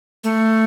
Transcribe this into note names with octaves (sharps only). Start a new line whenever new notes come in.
A3